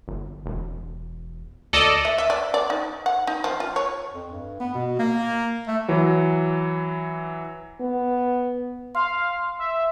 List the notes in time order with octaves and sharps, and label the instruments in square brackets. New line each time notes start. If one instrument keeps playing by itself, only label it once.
[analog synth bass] G1
E1
[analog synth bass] D2 [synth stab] A4 D5 D#5
[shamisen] E5
E5
D5
D5
D#4
F#5
D#4
F3
F4
C#5
[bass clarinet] F2
G2
B3
B2
A#3
A3
[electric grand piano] E3 F#3
[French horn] B3
[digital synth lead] F5 [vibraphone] C6
[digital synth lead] E5